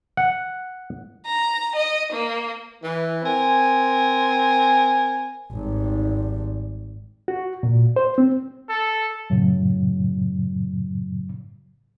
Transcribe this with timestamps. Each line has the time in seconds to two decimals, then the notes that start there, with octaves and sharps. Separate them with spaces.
0.17 F#5
1.25 A#5
1.75 D#5
2.12 A#3
2.82 E3
3.22 C4 A#4 G#5
5.52 G#1 G3
7.28 F#4
7.63 A#2
7.96 C5
8.18 C4
8.70 A4
9.30 F#2 A2 C#3 F#3